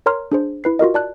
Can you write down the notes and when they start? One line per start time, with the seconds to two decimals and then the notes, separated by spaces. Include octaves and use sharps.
0.06 A#4 C#5 A#5 C6 F6
0.32 D4 G#4 C5
0.64 E4 B4 C7
0.79 F4 F#4 A#4 D#5
0.94 D5 A5 F#6